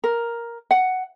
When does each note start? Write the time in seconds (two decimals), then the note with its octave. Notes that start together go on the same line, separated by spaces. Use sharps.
0.04 A#4
0.71 F#5